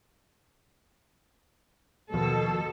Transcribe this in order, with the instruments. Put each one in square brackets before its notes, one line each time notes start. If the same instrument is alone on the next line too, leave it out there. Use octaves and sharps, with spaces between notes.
[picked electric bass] D#2 F3 [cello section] B2 A4